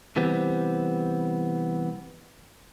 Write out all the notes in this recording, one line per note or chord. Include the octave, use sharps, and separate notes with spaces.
C3 E3 G3 B3 C4